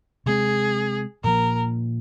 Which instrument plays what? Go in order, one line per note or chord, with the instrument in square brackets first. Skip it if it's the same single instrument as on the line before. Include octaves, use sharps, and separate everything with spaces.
[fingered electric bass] C3 G#3 C4 [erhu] G#4
[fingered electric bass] A#2 F3 A#3 [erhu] A#4